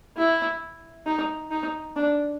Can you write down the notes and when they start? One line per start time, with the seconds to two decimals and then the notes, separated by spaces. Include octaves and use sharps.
0.17 E4
1.06 D#4
1.51 D#4
1.96 D4